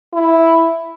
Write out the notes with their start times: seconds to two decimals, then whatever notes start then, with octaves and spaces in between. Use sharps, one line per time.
0.14 E4